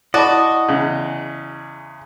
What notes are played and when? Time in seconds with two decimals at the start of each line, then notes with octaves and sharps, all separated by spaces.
0.14 E4 F#4 D5 D#5 A5 B5
0.68 E2 C#3